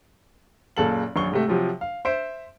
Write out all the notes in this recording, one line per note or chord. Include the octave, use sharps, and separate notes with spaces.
F#1 A#2 C#3 A4 F5 F#7
A#1 F#2 C#6 G7
G#2 C3 A3
C3 F3 F#3
F5
C5 E5 D7